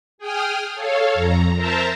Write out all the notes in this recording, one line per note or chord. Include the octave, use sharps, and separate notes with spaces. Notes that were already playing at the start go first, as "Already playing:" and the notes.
G#4 G5 D#6 F6
A4 C#5 F5
F2 A#5
A#4 C5 E5 A5 A#5